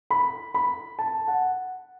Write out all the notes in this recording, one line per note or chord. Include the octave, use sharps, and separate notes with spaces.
B5
B5
A5
F#5